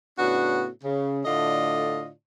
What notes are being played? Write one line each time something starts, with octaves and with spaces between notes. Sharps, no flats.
A2 C#3 B3 D4 F#4
C#3
A2 D3 A3 F4 D5 D#5